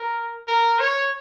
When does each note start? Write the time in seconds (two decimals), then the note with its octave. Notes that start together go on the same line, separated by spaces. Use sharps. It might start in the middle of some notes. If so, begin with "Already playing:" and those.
Already playing: A#4
0.48 A#4
0.79 C#5